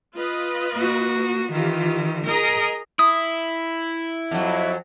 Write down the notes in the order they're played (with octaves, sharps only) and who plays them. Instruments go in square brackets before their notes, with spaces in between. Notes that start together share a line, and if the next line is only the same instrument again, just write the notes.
[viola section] F4 B4 D#5
[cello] A#3 F#4
[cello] D#3 E3 [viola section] F4 G4
[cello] G#4 A#4 [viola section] D#5 A#5
[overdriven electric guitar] E4 [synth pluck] D#6
[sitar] F2 F#3